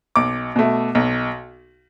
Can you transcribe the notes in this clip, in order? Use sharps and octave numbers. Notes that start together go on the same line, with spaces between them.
B1 D6
B2 A3
B1